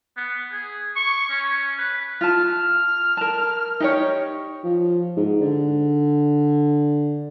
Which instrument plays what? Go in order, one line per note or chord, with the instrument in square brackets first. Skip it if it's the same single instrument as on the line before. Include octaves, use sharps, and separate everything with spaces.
[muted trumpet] B3
G#4
C#6
C#4
B4
[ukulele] F4 A5 [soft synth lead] F6
[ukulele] A#4 A5
D#4 G4 C#5
[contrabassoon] F3
G#2
D3